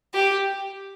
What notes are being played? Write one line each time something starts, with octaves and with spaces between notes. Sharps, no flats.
G4